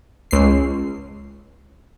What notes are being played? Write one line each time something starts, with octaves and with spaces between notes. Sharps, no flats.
C#2 C7